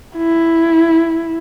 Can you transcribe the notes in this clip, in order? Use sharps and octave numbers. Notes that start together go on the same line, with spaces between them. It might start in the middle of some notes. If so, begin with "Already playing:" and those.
E4